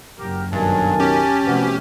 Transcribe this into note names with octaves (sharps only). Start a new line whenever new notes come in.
F#1 F#3 G4 A#4
B1 G2 D#3 G#5 A5
C#4 G4
C3 F3 A3 B3 F#4